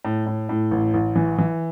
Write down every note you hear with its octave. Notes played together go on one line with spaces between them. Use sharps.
A2
A2
A2
A1
A1
E3
E3